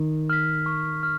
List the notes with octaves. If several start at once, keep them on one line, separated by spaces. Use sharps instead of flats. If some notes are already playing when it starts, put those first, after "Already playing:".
Already playing: D#3
F6 B6
C#6
F6